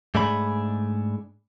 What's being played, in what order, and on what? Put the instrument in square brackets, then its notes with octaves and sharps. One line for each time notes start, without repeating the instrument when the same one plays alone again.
[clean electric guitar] G#2 A3 D4 G#4 B5